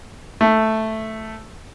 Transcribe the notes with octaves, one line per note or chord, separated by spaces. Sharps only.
A3